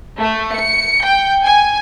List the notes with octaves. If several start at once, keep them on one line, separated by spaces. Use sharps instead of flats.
A3
C#7
G5
G#5